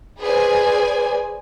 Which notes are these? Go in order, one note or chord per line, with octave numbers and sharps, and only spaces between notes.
G#4 B4 C5 D5 G#5